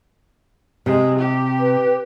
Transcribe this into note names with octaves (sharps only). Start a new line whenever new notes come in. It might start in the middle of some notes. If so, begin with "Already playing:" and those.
C3 G#3
G4
B4